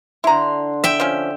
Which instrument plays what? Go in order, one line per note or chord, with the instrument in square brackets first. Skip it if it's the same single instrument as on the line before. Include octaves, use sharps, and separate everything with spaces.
[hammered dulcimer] D3 C6 [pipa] E4 A#5
[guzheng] E5 G5
[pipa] F3 C#4